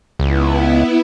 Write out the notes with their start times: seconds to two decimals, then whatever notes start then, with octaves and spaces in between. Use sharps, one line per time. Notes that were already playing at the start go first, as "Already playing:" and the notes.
0.19 C#2 B3 E4